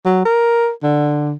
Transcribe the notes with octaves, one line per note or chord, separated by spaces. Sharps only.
F#3
A#4
D3